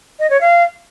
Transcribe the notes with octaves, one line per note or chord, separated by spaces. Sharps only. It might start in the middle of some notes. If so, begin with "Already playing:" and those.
D#5
C#5
F5